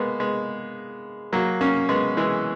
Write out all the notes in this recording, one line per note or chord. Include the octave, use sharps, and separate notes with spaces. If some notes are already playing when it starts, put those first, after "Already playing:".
Already playing: G#3 A#3 B3
G#3 B3
F#3 A#3
A#3 C#4
G#3 B3
E3 G#3